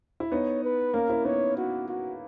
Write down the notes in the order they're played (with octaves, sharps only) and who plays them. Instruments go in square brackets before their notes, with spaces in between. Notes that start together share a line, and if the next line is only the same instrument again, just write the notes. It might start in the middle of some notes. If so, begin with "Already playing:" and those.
[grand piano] E4
[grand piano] B3 D#4 [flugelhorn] C#5
[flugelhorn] B4
[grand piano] A#3 C#4 [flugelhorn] A#4
[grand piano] C#4 E4
[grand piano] B3 D#4 [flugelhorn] C#5
[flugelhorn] F#4
F#4